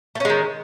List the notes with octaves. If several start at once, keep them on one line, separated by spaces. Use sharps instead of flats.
D#3 G#3 A3 C#4